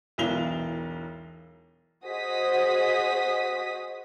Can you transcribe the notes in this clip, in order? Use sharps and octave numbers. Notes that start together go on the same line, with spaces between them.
E1 B1 E3 F7 G7
F#4 G#4 C5 D#5 D#6 B6